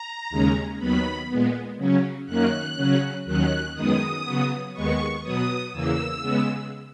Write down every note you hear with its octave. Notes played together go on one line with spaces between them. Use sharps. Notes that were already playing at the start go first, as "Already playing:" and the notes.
Already playing: A#5
D#2 C#3 G#3 C#4
D#2 D#3 F#3 B3 B5
A#2 G#3 B3
C#3 F#3 C#4
F#2 D#3 A#3 C#4 F#6
C#3 F#3 C#4
D#2 D#3 F#3 C#4 F#6
F#2 D#3 G#3 B3 D#6
C#3 F#3 B3
D#2 D#3 G#3 B3 C#6
B2 F#3 B3 D#6
E2 C#3 E3 A#3 E6
C#3 G#3 B3